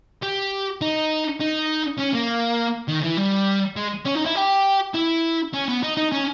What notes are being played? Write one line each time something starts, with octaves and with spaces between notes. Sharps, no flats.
G4
D#4
D#4
C#4
A#3
D#3
E3
G3
G#3
C#4
D#4
E4
G4
E4
C#4
B3
D#4
D#4
C#4